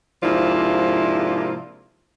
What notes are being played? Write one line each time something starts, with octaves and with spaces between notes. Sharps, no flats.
G#2 C3 F3 A#3 D4 E4